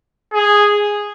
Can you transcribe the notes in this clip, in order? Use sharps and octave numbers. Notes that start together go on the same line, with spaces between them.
G#4